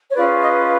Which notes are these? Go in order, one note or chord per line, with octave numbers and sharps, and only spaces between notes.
C#5
C#4 F4 G#4 B4 D5
D#5